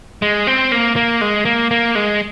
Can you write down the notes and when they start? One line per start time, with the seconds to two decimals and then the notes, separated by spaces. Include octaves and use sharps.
0.22 G#3
0.47 C4
0.72 A#3
0.96 A#3
1.21 G#3
1.45 A#3
1.71 A#3
1.95 G#3